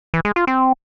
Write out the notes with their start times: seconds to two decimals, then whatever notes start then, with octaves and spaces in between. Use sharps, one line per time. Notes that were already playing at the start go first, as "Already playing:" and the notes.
0.14 E3
0.25 G#3
0.36 F4
0.47 C4